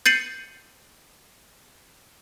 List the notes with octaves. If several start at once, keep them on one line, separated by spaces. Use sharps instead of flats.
G6 A6 C7 C#7 D#7 F#7